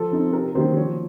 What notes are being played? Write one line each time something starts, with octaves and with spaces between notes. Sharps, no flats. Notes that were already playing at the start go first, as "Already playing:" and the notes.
Already playing: F3 A4
C4 D#4
C3 A#4
D#3 F#3 A#3 D#4 C5
F3 C#5